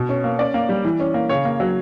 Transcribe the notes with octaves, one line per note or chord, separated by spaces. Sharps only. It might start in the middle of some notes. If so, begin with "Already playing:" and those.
Already playing: B2
C#4
A#3
C#4 D5
A#3
G3
E3
C#4
A#3
C#3 C#5
A#3
F#3